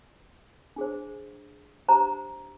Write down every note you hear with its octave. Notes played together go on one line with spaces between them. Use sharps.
D4 G#4 C5
D4 G4 C5 A#5